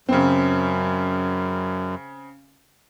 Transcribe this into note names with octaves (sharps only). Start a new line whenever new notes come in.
F#2 C#3 C4